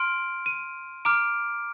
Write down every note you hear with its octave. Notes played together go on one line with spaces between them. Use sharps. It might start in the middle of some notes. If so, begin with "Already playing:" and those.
Already playing: C6 F6 D7
D#7
A#5 D6 F6 D7